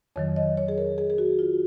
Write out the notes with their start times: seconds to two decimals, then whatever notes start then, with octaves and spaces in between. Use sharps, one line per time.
0.16 F2 D#3 F#3 C#5
0.36 D#5
0.57 C#5
0.68 G#4
0.78 A#4
0.98 G#4
1.10 G#4
1.18 F#4
1.39 F4